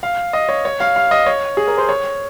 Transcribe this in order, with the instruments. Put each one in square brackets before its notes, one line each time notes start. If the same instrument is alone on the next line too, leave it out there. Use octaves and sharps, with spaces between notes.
[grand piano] F5
D#5
C#5
C#5
F5
F5
D#5
C#5
G#4
A#4
C5
C#5